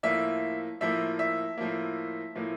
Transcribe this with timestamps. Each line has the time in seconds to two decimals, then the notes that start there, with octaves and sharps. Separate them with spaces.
0.03 A2 F3 A#3 E5
0.81 A2 F3 A#3 E5
1.19 E5
1.58 A2 F3 A#3
2.36 A2 F3 A#3